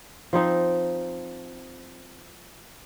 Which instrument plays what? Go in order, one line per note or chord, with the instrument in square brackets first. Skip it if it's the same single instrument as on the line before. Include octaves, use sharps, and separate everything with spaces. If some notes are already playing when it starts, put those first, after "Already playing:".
[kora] F3 C4 D#4 C5